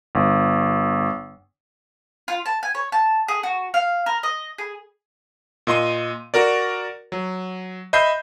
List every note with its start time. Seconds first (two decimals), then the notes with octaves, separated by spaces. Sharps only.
0.15 G1
2.28 F4
2.46 A5
2.63 G#5
2.75 C#5
2.92 A5
3.28 G#4
3.43 F#4
3.74 F5
4.06 A#4
4.23 D#5
4.58 G#4
5.67 A#2 D#5 C6 D#7
6.34 F#4 A#4 D5
7.12 F#3
7.93 D#5 E5 B5 G6 C7